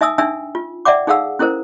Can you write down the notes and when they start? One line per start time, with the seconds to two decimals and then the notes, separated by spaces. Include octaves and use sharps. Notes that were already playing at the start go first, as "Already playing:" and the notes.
0.01 D#4 E5 G#5 D#6 E6
0.18 D4 D#4 E5 G5 G#5 E6
0.55 F4
0.85 D5 E5 F#5 G5 D6
1.07 D#4 G#4 A4 F5 F#5 E6
1.39 C#4 E4 A4 A#4 C5